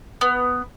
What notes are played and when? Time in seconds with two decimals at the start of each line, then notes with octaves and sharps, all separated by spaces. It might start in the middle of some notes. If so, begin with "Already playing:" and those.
0.21 B3